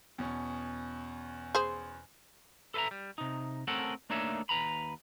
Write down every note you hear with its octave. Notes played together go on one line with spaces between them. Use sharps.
E2 B2 C#4
G#4 C5
A4 B4 D#5 E5 A#5
G3
C3 D#4
A3 C4 C#4 A4 A#4 F#5
A3 A#3 D4 D#4 C#5 E5
D#2 B2 B4 A#5 B5